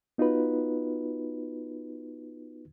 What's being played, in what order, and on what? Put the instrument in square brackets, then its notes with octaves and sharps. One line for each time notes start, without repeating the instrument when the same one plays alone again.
[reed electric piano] B3 D#4 F4 F#4 B4